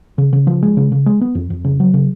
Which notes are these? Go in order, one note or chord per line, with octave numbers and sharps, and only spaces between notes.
C#3
C#3
F3
G#3
C#3
C#3
G#3
B3
F2
F2
C#3
F#3
C#3